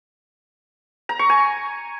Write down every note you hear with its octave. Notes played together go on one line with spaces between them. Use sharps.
A#5
C#6
G#5